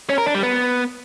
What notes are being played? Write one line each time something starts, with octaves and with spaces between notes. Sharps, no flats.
C#4
A#4
D4
G3
B3